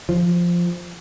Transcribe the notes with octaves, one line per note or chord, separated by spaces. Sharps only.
F3